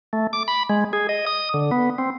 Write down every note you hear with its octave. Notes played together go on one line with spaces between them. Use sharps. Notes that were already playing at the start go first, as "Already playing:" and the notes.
A3
D6
B5
G#3
G#4
D#5
D#6
D3
B3
C4